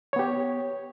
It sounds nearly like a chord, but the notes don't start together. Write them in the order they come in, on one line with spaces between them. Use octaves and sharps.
C#5 B3 G4